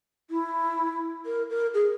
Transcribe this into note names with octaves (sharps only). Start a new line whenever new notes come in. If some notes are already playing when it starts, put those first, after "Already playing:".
E4
A#4
A#4
G#4